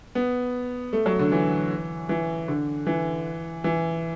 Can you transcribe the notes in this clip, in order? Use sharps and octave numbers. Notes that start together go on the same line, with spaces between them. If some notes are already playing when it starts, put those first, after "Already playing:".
B3
A3
F#3
D3
E3
E3
D3
E3
E3